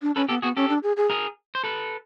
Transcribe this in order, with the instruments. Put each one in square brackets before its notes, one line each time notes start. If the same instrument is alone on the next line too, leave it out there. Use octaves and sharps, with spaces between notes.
[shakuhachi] D4
[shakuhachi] C#4 [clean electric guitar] A4 B4
[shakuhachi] B3 [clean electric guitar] G4 A4
[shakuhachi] B3 [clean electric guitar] F#4 G#4
[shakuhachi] C#4 [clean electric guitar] G4 A4
[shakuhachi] D4
G#4
G#4
[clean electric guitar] G#4 A#4
C5
A4 B4